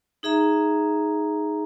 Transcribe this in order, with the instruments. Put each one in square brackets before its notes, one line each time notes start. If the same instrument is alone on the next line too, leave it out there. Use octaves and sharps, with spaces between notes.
[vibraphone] D#4 G#4 E5 A#5